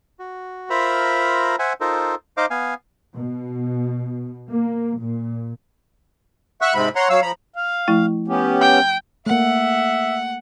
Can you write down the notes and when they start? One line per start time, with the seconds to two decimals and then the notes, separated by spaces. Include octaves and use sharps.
0.19 F#4
0.70 F4 A#4 C5 E5 A#5 B5
1.59 C5 E5 F#5 G#5
1.81 D#4 F4 A4 A#4 C5
2.37 D#4 C5 D#5 F5 D6
2.50 B3 F5 G#5
3.14 B2
4.50 A#3
5.00 A#2
6.62 E5 F#5 C#6 E6 F#6
6.75 G#2 C3 G#3 C4 B5
6.96 C#5 F#5 A#5 C6
7.10 F#3 C#5 F5 E6
7.22 F3 A#5 B5
7.56 F5
7.88 F3 A3 E4
8.28 B3 C#4 G4
8.61 G5
9.26 A3 A#3 E5 F#5